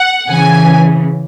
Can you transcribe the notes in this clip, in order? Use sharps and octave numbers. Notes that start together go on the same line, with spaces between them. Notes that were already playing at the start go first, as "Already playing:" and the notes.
Already playing: F#5
C#3 E3 G#5